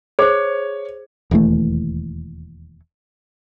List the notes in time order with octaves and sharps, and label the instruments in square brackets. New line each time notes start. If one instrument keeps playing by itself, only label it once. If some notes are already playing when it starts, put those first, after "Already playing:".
[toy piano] G#4 C5 [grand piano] C#5
[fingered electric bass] E1 D#2 E3 A3